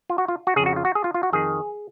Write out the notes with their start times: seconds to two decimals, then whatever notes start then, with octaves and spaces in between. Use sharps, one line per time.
0.10 F4
0.18 F#4
0.28 F4
0.47 F#4
0.56 C#3 G#4
0.59 F2
0.66 F#4
0.76 F4
0.85 F#4
0.95 G#4
1.04 F4
1.14 F4
1.23 F#4
1.33 F2 D#3 G#4